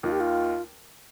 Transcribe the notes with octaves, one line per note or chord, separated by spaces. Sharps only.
D#2 D#3 F4
G4
F4